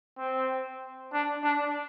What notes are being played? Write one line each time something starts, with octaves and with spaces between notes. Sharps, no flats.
C4
D4
D4